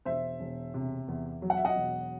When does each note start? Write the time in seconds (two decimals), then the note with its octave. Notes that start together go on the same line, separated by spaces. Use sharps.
0.05 E1 C5 E5
0.40 E1
0.74 C3
1.08 E2
1.42 F#3
1.50 F#5
1.57 E5
1.65 D#5 F#5
1.76 E1